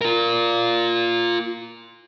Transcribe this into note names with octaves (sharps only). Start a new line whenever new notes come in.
F4 A#4